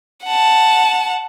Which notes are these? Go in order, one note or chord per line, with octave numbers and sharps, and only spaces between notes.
F#5 A5